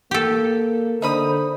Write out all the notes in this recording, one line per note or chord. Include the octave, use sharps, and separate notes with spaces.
A#3 G4 A4
D3 D#4 C5 B5 D#6